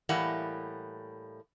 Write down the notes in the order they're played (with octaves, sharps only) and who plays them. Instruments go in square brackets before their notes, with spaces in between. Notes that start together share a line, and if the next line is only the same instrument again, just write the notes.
[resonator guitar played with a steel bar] A2 E3 G3 A#3 F#5